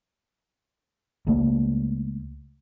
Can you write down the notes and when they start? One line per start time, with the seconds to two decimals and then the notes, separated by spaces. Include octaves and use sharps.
1.27 C#2 A3 A#3